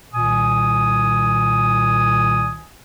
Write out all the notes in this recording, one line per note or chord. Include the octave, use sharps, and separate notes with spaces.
C2 A#2 D#3 G#5 D#6